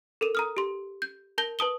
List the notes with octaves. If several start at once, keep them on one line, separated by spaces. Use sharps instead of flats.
A4 A#4 D#7
A#5 D#6 F6
G4 C6
G6
A#4 A5 G6 A#6 G7
B4 A5 D#6 G7